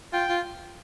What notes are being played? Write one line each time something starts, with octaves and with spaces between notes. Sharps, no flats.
F4 G5
F4